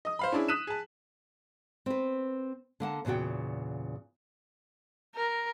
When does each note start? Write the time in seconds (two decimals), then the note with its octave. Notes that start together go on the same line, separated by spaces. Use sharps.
0.05 D#5 D#6
0.19 C5 F5 B5
0.32 C#4 D4 E4 G#4
0.48 D#6 F#6 B6 D#7 E7
0.67 G#4 A5
1.86 C4 B4
2.80 D3 A#3 F#5 A5
3.05 E2 A#2 C#3 F#4 G5
5.15 A#4